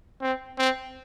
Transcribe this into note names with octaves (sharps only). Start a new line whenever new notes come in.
C4
C4